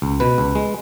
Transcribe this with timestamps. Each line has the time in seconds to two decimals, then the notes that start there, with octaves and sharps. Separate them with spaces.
0.02 C#2
0.20 B2 B4
0.38 C#2
0.55 G#3